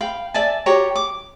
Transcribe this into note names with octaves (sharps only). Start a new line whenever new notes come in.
F5 G5 B5
D5 E5 G#5 A5
F#4 G4 C#5 A#5
D6